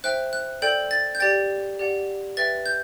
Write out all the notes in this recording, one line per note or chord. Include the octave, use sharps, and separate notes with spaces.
C5 E5 G5 F#6
F#6
A4 D5 G5 G6
A6
G6
G4 D5 G5 A6
G4 D5 F#5
B4 E5 G5 A6
G6